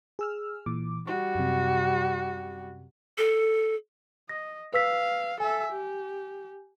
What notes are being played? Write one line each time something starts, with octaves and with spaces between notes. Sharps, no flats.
G#4 E6 F6
A#2 E3 D6
G3 F#4 C#6
F#2 C3
A4
D#5 A#6
B4 F5 E6 B6
A4 E5 G#5
G4